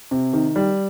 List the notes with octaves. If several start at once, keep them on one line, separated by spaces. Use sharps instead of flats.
C3
D#3
G3